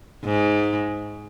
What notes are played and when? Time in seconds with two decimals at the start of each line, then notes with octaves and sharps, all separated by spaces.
0.25 G#2